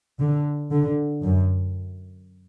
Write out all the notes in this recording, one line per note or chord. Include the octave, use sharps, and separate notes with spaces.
D3
D3
F#2